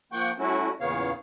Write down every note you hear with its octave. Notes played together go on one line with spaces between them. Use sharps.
F3 A#3 F#5 G5 C#6 G6
G3 A3 C#4 E4 F#4
E2 A#2 C#3 B3 C#5 F5